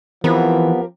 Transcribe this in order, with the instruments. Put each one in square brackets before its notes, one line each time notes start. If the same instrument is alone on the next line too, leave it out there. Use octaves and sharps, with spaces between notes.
[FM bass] E3 [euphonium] F3 [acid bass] B3 [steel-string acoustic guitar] C4 G4 A#4